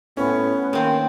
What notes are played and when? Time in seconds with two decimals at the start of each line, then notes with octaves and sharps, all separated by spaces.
0.17 A2 B3 C#4
0.73 D#3 A#3 C4